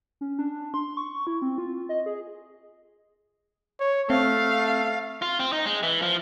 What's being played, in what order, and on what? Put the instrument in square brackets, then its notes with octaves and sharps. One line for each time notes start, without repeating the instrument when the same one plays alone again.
[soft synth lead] C#4
D4
C6
C#6
E4
C4
F4
D#5
G#4
[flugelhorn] C#5
[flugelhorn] A3 [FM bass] C4 [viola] F5
[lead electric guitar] F4
C4
D#4
G#3
E3
F3